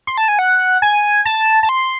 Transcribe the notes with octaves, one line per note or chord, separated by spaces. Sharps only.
C6
A5
G#5
F#5
G#5
A5
A5
C6